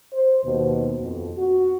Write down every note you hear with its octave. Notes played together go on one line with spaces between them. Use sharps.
C5
D#2 B2
F2
F#4